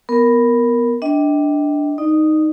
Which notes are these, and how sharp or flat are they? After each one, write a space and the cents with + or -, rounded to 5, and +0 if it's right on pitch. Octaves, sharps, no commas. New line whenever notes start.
B3 +0 A#4 +0
D4 +0 D#5 +35 G5 +0
D#4 +0 D5 +45